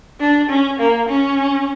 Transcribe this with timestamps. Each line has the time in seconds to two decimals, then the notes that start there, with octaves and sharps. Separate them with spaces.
0.20 D4
0.50 C#4
0.80 A#3
1.09 C#4